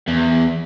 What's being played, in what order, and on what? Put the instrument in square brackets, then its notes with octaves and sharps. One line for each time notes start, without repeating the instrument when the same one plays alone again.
[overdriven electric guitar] E2